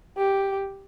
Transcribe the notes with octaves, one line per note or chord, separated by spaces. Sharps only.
G4